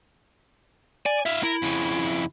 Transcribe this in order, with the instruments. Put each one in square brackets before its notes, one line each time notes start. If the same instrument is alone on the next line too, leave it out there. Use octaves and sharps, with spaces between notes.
[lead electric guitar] D5 [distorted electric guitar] G#5
[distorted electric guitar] E4 F5 [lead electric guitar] E5
[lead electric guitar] E4 [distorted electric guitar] A#4
[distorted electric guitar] F2 C#3